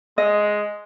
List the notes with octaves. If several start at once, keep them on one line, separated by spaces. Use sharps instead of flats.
G#3 D#5